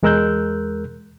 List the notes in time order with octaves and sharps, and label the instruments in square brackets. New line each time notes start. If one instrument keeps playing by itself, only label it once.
[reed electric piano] E2 G#3 A#4 E6 F#6 G6